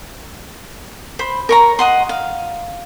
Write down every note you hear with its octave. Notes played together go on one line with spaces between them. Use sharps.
C5 B5
A#4 C#5 A#5
D#5 F#5 C6
F5